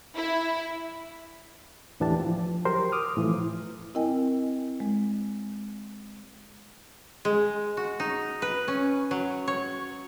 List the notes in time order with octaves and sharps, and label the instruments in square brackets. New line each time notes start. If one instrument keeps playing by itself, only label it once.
[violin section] E4
[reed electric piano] D#2 A2 E3 D4 G4 A5
F3
F#3 G4 A#4 C5 C6
D6 D#6 F6
A2 E3 F3
[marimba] C4 E4 A#4 D#5 G5 G#5
G#3
[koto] G#3
F#4
D#4
B4
C#4
F#3
C#5